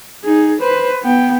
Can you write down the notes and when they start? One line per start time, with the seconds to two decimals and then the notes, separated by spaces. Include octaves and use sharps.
0.24 D#4 G#4
0.61 B4 C5
1.03 B3 G5